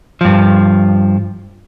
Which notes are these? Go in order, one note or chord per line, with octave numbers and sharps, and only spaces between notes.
G2 F3